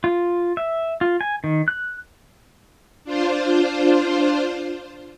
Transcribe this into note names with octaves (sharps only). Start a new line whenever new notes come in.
F4
E5
F4
G#5
D#3
F#6
D4 F4 C5